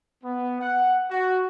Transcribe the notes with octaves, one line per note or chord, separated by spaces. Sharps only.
B3
F#5
F#4